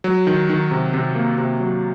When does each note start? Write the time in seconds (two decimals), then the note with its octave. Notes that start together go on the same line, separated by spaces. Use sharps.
0.04 F#3
0.27 D#3
0.49 D#3
0.71 C3
0.94 C3
1.15 A#3
1.38 C3
1.60 F#3